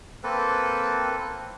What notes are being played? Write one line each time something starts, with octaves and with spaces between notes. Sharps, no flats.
A#3 C4 A4 B4